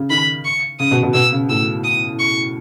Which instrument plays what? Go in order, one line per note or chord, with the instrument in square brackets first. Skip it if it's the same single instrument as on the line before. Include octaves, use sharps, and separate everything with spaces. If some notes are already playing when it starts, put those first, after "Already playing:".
Already playing: [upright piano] C#3
[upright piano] D#3 [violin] B5
[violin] C#6
[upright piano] C#3 [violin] D#6
[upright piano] B2
B2
[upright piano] B2 [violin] E6
[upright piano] C#3
[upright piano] A2 [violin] E6
[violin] D#6
C#6